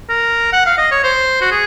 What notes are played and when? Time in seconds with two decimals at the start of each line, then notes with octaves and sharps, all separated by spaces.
0.09 A#4
0.53 F#5
0.66 F5
0.78 D#5
0.91 C#5
1.04 C5
1.41 F#4
1.51 G#4